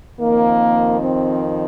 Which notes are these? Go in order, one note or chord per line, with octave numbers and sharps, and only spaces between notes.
F2 D#3 A#3
C4